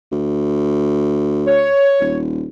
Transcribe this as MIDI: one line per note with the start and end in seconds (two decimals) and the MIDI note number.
0.12 1.72 38
1.47 2.16 73
2.00 2.47 27